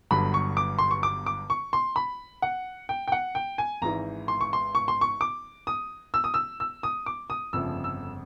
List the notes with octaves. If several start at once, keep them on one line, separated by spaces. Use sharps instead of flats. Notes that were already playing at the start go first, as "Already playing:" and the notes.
G1 G2 D3 F#3 B5
C#6
D6
C6
C#6
D6
D6
C#6
C6
B5
F#5
G5
G5
F#5
G5
G#5
G#1 G#2 E3 A#5
C6
C#6
C6
C#6
C6
C#6
D6
D#6
E6
D#6
E6
E6
D#6
D6
D#6
G1 F2 C#3 F3 A3 E6
E6